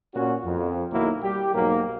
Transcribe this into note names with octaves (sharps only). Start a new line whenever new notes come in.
A#2 C#4 F#4
F2
B1 D#3 F#3 A#3 E4
G3 G4
B1 G#2 F#3 A#3